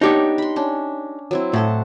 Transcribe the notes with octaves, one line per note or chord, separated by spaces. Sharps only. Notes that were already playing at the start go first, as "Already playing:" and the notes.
B3 D4 D#4 G4 C#5
B5 C6
C#4 D4
F#3 C4 E4
A2 F#4 A4 D#5